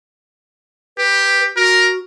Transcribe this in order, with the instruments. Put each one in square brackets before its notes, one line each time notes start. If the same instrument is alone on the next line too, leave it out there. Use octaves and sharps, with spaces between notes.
[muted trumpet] G4 [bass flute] B4
[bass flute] F#4 [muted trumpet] A#4